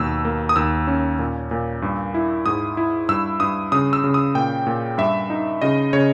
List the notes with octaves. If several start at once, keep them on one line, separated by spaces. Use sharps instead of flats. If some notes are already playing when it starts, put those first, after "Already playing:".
Already playing: D#2 B2 E6
A#3
D#6
D#2 E6
C#4
A#2
A#2
G2
E4
G#2 D#6
E4
G2 E6
G2 D#6
C#3 D#6
E6
C#3
D#6
A#2 G5
A#2
G2 E5
D#4
C#3 D#5
C#3 C#5